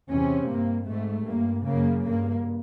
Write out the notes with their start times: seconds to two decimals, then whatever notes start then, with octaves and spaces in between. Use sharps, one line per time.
0.12 E2 C3 C#4
0.50 G2 A#3
0.88 G#2 A3
1.28 G2 A#3
1.67 F#2 C#3 A#3
2.05 G2 A#3